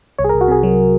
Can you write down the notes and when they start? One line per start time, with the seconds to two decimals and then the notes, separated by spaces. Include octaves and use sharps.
0.19 C2 C#5
0.24 G#4
0.29 A#4
0.34 C2
0.41 F#4
0.48 C3 G#4
0.63 F#3